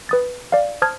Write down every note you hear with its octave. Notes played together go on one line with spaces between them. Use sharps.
B4 D#6 A6
D5 F5
C5 A5 D#6 F6 G#6